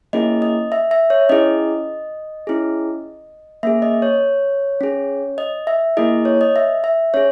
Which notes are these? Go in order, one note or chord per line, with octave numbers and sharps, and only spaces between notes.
A#3 C#4 E4 G#4 D#5
D#5
E5
E5
C#5
C#4 E4 G#4 D#5
C#4 E4 G#4
A#3 C#4 G#4 E5
D#5
C#5
C#4 G#4
D#5
E5
A#3 E4 G#4 D#5
C#5
D#5
E5
E5
C#4 G#4 C#5